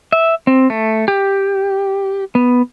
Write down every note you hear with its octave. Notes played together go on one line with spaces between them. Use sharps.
E5
C4
A3
G4
B3